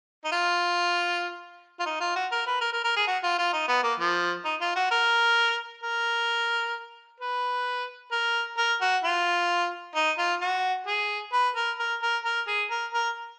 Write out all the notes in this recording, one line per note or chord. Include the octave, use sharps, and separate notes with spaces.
D#4
F4
F4
D#4
F4
F#4
A#4
B4
A#4
A#4
A#4
G#4
F#4
F4
F4
D#4
B3
A#3
F3
D#4
F4
F#4
A#4
A#4
B4
A#4
A#4
F#4
F4
D#4
F4
F#4
G#4
B4
A#4
A#4
A#4
A#4
G#4
A#4
A#4